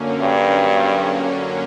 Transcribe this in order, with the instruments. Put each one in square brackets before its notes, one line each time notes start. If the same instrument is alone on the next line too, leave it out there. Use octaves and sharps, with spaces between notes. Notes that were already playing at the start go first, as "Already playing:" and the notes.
Already playing: [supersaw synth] F#2 D3 F#3 A#3 C#4
[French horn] G2